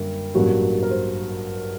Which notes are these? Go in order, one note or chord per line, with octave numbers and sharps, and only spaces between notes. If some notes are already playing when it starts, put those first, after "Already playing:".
Already playing: F#2 D3 G3 A#3
A1 G2 F#3 A#3 F#4
A#4
C5